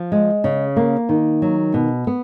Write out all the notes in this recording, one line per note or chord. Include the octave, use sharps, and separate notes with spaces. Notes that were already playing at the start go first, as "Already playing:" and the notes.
Already playing: F3
G#3
C#3
A#3
D#3
F#3
B2
B3